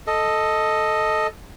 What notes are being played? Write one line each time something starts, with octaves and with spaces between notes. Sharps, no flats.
A4 D#5